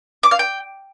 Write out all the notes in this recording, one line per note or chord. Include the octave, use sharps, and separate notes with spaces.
D6
F5
G5